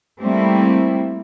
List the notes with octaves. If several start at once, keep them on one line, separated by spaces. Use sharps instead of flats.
G3 A3 A#3 C4 E4